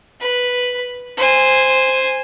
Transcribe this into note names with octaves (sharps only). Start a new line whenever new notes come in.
B4
C5 G#5